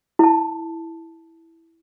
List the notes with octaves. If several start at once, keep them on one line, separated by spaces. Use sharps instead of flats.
E4 A5